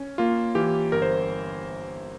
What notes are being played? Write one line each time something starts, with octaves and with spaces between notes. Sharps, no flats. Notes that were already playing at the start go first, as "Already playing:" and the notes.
Already playing: C#4
A#3 F4
E3 G4
G1 A#4
C5